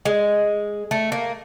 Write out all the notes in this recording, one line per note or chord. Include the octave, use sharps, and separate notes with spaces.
G#3
A3
A#3